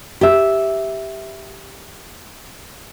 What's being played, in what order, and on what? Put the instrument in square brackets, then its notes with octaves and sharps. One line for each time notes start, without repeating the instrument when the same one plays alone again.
[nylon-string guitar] G4 E5